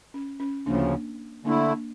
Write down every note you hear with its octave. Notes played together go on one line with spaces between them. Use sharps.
C#4
C#4
D2 C#3 F3 A#3 D4
D3 A3 A#3 D4 E4